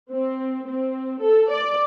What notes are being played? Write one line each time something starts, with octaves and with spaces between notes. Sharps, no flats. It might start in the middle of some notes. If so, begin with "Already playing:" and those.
C4
C4
A4
D5